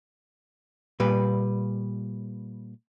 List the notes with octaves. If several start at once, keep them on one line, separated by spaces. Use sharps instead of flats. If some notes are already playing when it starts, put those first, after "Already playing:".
A#2 G3 B4